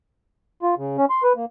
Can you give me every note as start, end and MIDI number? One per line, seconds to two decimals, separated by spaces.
0.63 0.75 65
0.78 0.97 49
0.98 1.05 61
1.10 1.23 84
1.23 1.33 71
1.36 1.45 58